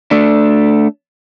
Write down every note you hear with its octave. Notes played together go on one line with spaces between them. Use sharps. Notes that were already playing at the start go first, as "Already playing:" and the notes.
A3 D4